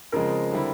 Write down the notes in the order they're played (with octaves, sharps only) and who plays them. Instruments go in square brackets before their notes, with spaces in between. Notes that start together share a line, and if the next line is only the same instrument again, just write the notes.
[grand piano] C#3 F3 G#3 C4 [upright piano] A#4
[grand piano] D3 G3 C4 E4